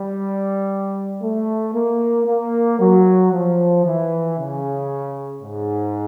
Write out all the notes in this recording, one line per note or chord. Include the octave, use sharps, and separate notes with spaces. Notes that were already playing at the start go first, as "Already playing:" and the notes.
Already playing: G3
A3
A#3
A#3
F#3
F3
E3
C#3
G#2